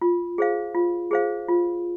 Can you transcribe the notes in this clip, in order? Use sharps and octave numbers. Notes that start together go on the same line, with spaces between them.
F4
G#4 C5 F5
F4
G#4 C5 F5
F4